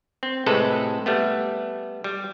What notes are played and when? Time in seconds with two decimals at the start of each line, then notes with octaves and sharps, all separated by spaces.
0.23 C4
0.46 A2 C3 G#3 A4 B4
1.06 G3 A3 B3
2.04 G3